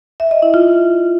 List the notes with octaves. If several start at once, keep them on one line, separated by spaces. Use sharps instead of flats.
E5
D#5
E4
F4